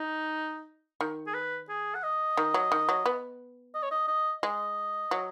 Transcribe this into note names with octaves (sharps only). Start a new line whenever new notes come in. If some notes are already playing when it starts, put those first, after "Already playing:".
Already playing: D#4
D#3
G#4
B4
G#4
F#5
D#5
D#3
F#3
D#3
F#3
B3
D#5
C#5
D#5
D#5
G#3 D#5
F#3